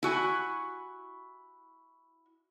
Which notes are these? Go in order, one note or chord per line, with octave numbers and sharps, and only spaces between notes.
E4 F#4 G#5